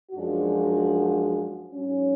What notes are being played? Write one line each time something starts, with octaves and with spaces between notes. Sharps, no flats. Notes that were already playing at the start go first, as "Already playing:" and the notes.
F#2 F3 G#3 D4 F#4
G#2 F#3 C#4